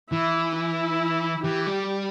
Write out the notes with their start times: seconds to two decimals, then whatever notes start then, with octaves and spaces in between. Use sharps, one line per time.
0.11 E3 E4
0.56 E4
1.44 E3 G4
1.67 G3